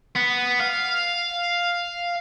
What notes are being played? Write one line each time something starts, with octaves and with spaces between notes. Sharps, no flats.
B3
F5